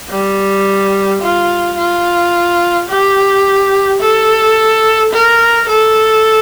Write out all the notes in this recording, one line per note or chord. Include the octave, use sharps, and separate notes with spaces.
G3
F4
F4
G4
A4
A#4
A4